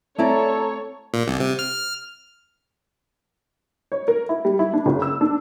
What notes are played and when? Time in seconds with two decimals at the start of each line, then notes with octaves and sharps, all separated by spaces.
0.18 A3 C4 E4 A4 C#5 D5 A#5
1.14 A#2
1.28 C2
1.40 C3
1.59 F6
3.92 C#5
4.08 A#4
4.29 E4
4.45 G3
4.59 E4
4.73 D4
4.86 F#1
5.02 E6
5.21 D4